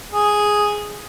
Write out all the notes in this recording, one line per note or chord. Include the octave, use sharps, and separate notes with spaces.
G#4